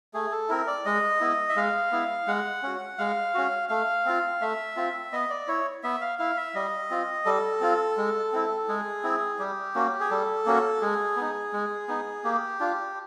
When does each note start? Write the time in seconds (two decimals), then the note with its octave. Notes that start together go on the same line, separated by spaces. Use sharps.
0.14 A3 G#4
0.32 A4
0.49 C4 E4 A#4
0.67 D5
0.85 G#3 D#5
1.21 B3 E4
1.49 E5
1.56 G#3 F5
1.92 B3 E4
2.28 G#3 F#5
2.63 C#4 F#4
2.98 G#3 F5
3.34 C#4 F#4
3.69 A3 F5
4.06 C4 F4
4.41 A3 E5
4.77 C4 F4
5.13 B3 D#5
5.30 D5
5.48 E4 C#5
5.83 B3 E5
6.01 F5
6.19 E4 F5
6.37 E5
6.55 G3 D#5
6.90 C4 F4
7.26 G3 A4
7.61 C4 F4
7.97 G#3
8.32 C4 E4
8.68 G#3 G#4
9.04 C4 E4
9.39 G3 G4
9.75 A#3 C#4 F#4
10.00 G#4
10.11 G3 A4
10.46 A#3 C#4 F#4
10.82 G#3 G#4
11.17 B3 D#4
11.53 G#3
11.88 B3 D#4
12.24 A#3 G4
12.60 D4 F4